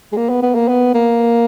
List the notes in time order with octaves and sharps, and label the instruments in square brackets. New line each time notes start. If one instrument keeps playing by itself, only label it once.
[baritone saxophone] G#3
A#3
B3
B3
A#3
B3
A#3